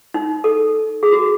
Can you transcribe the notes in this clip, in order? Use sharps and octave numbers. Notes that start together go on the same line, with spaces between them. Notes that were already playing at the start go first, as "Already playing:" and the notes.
D#4
A4
G#4
F#4